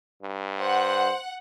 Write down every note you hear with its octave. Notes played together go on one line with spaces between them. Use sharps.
G2
C5 F#5